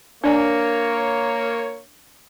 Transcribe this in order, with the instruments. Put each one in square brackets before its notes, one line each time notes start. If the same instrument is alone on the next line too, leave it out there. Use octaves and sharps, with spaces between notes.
[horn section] A#3 C#5 [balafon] D4 D5 G#5